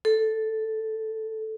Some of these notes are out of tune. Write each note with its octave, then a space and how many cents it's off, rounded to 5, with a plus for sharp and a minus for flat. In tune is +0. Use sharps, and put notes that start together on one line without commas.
A4 +0